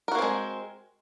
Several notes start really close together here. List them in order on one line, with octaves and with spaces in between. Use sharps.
A#4 F#4 A#3 C4 G#3